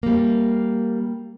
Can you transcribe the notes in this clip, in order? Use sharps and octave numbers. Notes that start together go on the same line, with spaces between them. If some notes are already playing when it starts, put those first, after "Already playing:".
G3 A#3